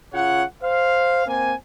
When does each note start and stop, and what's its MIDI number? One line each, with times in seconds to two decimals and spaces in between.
0.13 0.43 49
0.13 0.43 65
0.13 0.43 73
0.13 0.43 78
0.62 1.25 72
0.62 1.25 77
1.26 1.53 58
1.26 1.53 60
1.26 1.53 80